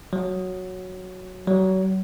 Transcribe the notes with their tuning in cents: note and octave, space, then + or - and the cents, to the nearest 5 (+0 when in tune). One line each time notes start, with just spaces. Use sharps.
F#3 -5
F#3 +30